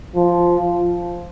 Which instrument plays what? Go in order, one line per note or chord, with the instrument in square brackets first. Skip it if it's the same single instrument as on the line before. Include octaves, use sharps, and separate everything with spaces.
[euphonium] F3